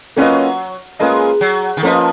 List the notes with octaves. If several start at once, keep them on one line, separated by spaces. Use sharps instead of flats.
F#3 A#3 C#4 F4 B4 D#5
G#3 A#3 C#4 F4 B4 D#5
F#3
D#3
F3 A#3 C#4 F4 B4 D#5